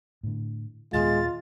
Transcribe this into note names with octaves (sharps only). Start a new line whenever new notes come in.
A2 D3
D#2 A#2 G#3 B3 F4 A6